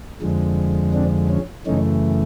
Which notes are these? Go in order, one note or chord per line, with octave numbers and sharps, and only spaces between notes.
F2 D3 F3 G#3
C4 D4
C#4
F#2 C#3 E3 A3 C#4 D#4